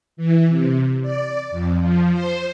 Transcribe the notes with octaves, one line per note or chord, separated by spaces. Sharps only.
E3
C3
D5
F2
F3
C5